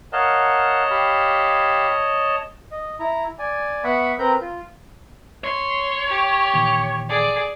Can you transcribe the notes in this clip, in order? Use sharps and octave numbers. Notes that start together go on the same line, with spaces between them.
A#4 C#5 D#5 F5 F#5 A5
G4 F5 B5
D#5
E4 A#5
D5 G#5
B3 E5 F#5 B5 C#6
C4 A#4 B4 A#5 G6
F4
C#5 C6
G4
A#2 D#3 E3
G#4 D5